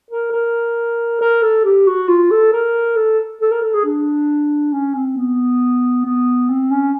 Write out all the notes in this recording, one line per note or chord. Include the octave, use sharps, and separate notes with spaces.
A#4
A#4
A#4
A4
G4
F#4
F4
A4
A#4
A4
A4
A#4
A4
G#4
D4
C#4
C4
B3
B3
C4
C#4